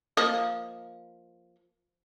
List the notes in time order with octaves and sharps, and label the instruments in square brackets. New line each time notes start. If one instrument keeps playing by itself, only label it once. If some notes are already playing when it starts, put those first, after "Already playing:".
[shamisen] F3 A#3 D#5